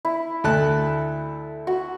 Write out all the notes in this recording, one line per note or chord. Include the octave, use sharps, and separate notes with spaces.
E4
D2 A4 A5 F#6
F#4